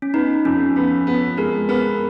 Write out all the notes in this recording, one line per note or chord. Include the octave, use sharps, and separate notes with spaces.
C#4
B3 D#4
F2 C#4
B3 C#4
B3
G#3 A#4
B3 A#4